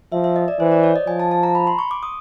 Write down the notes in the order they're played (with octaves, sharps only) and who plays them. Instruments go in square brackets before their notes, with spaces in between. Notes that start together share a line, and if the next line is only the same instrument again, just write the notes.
[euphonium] F3 [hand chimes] E5
[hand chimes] E5
D#5
D5
[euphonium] E3 [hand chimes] C5
[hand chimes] D5
C#5
D#5
[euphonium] F3 [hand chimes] G#5
[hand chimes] A5
A5
A#5
B5
C6
C#6
D6
D#6